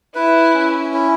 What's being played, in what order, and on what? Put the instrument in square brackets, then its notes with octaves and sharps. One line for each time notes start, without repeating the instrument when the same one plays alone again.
[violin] E4 [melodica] B4
[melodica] C#4
E4